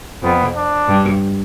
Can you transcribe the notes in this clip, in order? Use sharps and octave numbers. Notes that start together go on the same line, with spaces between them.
F2 B3
D4
G2